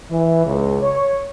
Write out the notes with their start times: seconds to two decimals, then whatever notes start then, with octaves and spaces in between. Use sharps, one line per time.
0.11 E3
0.46 C#2
0.82 C#5